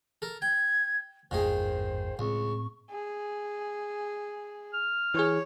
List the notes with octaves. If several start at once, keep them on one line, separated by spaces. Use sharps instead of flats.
A4 A#4
G5 G#6
G#1 E2 G2 A#2 D#3 G#4 C5
C#2 A2 C4 C#6
G#4
F6
E3 G#4 C#5